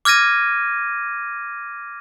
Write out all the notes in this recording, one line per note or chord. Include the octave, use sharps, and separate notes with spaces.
D6 F6 G#6 A#6 D#7